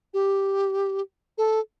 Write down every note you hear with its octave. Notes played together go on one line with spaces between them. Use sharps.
G4
A4